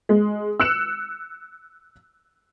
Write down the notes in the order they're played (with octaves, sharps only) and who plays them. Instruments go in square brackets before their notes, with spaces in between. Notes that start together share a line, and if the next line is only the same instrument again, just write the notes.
[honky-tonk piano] G#3
E6 F#6 C#7 E7